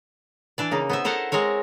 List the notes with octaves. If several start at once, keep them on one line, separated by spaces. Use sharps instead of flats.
E3 D4 D5
C#3 A#3 D#4
B3 C5 E5
E4 A4 A#4 C5 F#5
G#3 C4 A#4 C#5